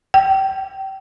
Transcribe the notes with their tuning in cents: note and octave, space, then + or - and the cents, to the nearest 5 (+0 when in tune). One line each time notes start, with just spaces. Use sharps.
G5 -25